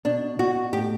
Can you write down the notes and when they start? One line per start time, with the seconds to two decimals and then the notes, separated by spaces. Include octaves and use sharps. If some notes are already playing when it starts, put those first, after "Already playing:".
0.05 B2 D4
0.39 B2 F#4
0.73 A2 G4